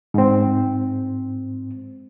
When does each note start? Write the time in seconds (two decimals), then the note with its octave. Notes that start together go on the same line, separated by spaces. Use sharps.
0.14 G#2 C4